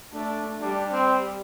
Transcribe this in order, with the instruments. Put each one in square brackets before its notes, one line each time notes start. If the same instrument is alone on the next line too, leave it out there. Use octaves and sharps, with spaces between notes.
[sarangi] A3 [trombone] D4
[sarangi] G3 [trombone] D4
[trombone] C4